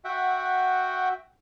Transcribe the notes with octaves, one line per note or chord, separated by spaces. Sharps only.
F#4 E5 F#5 G5